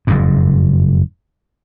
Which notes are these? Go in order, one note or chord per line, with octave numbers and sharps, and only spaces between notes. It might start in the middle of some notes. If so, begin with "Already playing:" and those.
F#1 F2 G#2